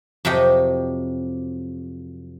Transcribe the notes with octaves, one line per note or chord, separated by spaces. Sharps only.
F2 C3 F#3 G4 D#5